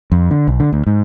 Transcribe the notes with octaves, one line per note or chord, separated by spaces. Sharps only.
F2
D3
B1
D3
D2
G#2